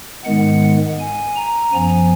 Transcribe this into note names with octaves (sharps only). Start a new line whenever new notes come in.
G#2 D#3 G#3 B3 F#5
G#5
A#5
F#2 F3 B3 G#5